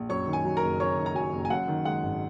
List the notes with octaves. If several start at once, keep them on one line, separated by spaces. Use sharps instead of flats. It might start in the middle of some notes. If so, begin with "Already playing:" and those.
Already playing: A#1
F#2 C#5 C#6
D#3
G#5
F#3
A#4 A#5
F#1
F#2 C#5 C#6
D#3
A#5
F#3 G#5
F#1
G#5
F#2 F#5
D#3
G#3 F#5
G#1